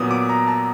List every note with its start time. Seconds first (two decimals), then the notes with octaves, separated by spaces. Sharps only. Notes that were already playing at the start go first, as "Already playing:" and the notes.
Already playing: A#2 F#3 B3 D#6
0.11 D6
0.29 A#5
0.48 A5